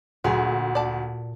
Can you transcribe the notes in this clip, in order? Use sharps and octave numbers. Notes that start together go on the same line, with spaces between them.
D2 A#2 F#3 G#4
D5 A5